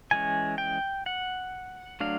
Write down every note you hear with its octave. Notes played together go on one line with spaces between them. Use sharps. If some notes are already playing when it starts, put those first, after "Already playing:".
E3 G#3 C#4 G#5
G5
F#5
F#3 A3 D4 F5